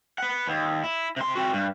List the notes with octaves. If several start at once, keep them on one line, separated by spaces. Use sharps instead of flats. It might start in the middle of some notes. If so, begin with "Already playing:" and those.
B4 F#5
D#2
E4
C3 C6
C4 F#4
G2